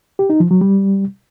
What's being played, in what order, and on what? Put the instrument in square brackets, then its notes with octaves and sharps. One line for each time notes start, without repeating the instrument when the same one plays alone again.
[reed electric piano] G4
D#4
F3
F#3
G3